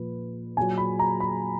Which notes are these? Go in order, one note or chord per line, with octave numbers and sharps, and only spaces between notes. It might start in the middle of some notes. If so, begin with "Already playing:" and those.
Already playing: A#2 F3 B4
A#2 F#3 G#5
B5
A#5
B5